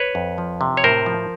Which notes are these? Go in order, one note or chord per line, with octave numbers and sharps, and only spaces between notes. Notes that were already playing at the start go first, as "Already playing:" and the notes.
Already playing: B4 C#5
F2
F3
C3
C#5
A2 A#4 C5
F3